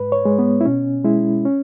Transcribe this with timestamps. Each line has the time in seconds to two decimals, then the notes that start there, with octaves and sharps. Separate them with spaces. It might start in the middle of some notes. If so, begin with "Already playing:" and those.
Already playing: G#2 B4
0.12 C#5
0.25 G#3
0.39 B3
0.61 E4
0.65 B2 C#4
1.04 G#3 E4
1.45 C#4